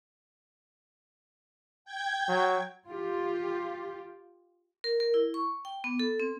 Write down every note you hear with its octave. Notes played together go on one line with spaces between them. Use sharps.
G5 G#6
F#3
F4 G4
A#4
A#4
E4
C#6
G5
B3
A4
C4